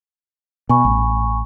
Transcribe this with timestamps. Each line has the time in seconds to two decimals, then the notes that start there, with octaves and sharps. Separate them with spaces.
0.69 B2 G#5 B5 C#6
0.85 A1